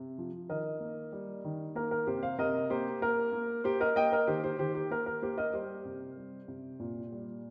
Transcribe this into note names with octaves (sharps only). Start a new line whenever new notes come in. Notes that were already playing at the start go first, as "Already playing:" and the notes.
Already playing: C3
F3
D#3 A#4 D#5
A#3
G3
D#3
A#3 A#4
A#4
C3 G4 C5
C5 F5
C3 A#4 D#5
A#3 G4 C5
A#3 A#4
A#3
A#3 G4 C5
A#4 D#5
A#3 D#5 G5
A#4 D#5
D#3 G4 C5
G4 C5
D#3 G4 C5
G4
A#3 A#4
A#4
A#3 G4 C5
A#4 D#5
G3 G4 C5
C3
G3
C3
A#2
G3